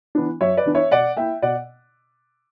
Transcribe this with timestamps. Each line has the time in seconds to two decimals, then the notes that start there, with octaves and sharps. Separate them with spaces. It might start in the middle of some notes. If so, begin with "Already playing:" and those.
0.15 E3 B3 D4
0.41 F#2 C#5 E5
0.57 B4 D5
0.66 E3 B3 D4
0.75 C#5 E5
0.91 B2 D5 F#5
1.17 A#3 E4 E5 G5
1.42 B2 D5 F#5